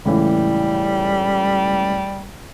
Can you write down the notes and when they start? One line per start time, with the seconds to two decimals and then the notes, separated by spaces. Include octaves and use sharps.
0.05 C#2 A2 E3 G3